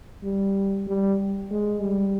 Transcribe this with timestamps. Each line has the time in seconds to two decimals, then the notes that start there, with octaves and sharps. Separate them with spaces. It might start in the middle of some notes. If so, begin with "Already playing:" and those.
0.23 G3
0.87 G3
1.51 G#3
1.82 G3